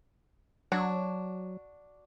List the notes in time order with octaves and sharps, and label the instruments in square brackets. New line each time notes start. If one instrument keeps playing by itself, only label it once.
[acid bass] F#3 [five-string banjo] D4 F#4 C#5